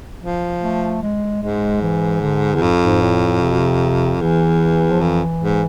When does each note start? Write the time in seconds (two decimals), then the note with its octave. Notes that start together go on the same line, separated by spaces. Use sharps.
0.22 F3
0.62 A3
1.03 G#3
1.42 G#2 G#3
1.82 E3
2.22 D3
2.54 E2
2.61 F2 G#2
2.81 G#2
3.02 A2
3.41 C3
3.51 B2
3.59 C3
4.21 E2 E3
4.90 F3
5.01 F2 E3
5.42 G#2